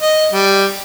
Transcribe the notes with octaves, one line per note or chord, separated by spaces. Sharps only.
D#5
G3